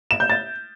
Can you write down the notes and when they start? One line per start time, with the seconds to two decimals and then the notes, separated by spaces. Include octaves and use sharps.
0.11 E7
0.20 G6
0.30 A6